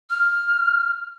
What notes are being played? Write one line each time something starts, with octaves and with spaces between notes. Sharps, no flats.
F6